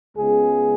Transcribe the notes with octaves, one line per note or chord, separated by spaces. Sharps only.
C#2 C#3 G#3 B3 G#4